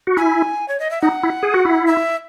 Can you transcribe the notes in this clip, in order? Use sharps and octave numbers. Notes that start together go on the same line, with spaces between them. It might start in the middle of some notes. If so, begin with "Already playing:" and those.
F#4
E4 G#5
C#5
D#5
E5
D#4 F#5
E4
G#4
F#4
E4
E5